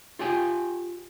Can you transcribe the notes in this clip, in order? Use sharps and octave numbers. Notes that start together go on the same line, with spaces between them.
F4 G4 G5 G#5